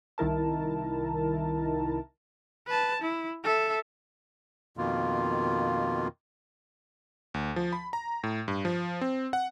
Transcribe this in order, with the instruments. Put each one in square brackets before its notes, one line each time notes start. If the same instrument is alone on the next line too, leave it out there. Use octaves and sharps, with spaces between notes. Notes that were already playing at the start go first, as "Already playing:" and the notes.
[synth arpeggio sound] C2 D#3 E4 A#4 A5
[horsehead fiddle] B4 A5
E4
A4 E5
[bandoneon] F2 B2 D#3 A#3 F4
[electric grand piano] D2
F3
B5
A#5
A2
G2
F3
C4
F#5